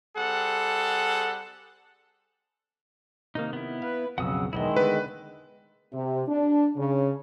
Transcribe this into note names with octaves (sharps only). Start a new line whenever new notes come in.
G3 C4 G#4 A4 F#5
C3 D#3 A#3 D#4
B3 E4
B4 F5
B1 F2 C#3 F#4 F#5 D#6 E6
B1 E2 D#3 G#3 B3 E4 D#5
D3 A3 B3 B4
C3
D4
C#3